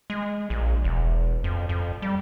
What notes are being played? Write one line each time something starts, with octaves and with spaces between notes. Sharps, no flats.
G#3
A#1
E1
F2
F2
G3